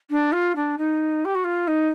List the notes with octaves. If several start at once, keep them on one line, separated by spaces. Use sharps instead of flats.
D4
F4
D4
D#4
G4
F#4
F4
D#4